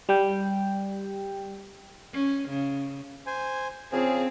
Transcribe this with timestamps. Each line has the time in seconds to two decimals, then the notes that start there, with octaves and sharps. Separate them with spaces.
0.09 G3 G5
2.13 C#4
2.49 C#3
3.27 C5 G#5
3.92 C#3 F3 C4 G#4